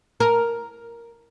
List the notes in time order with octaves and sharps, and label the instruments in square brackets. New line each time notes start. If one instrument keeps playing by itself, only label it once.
[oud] A#4